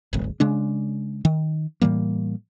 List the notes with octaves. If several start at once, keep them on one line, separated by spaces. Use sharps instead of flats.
D1 G#1
C#3 G#3 D4
D#3
A2 E3 G3 A#3